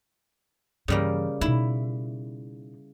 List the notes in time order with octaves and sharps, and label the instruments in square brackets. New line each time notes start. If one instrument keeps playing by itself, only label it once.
[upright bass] G2 E3 [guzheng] C#3 G3 A#3
[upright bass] B2 D#4 [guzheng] E4